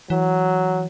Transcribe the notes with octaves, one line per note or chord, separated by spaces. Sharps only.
E3 F#3